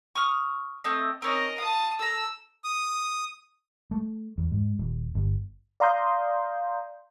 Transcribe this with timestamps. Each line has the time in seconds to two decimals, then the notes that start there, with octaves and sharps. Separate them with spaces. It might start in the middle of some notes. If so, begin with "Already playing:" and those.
0.15 C#6 D#6 F6
0.84 A3 C4 D#5
1.22 C4 C#4 D#4 A#4 D#5
1.58 F4 A5 D#6
1.99 A4 A#5 E6
2.64 D#6
3.91 A3
4.38 E2
4.52 G#2
4.79 D#1
5.15 G1
5.80 D5 F5 A#5 C6 D#6 G6